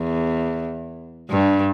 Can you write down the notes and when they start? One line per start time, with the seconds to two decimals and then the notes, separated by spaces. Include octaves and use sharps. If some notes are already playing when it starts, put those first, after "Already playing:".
Already playing: E2
1.30 G2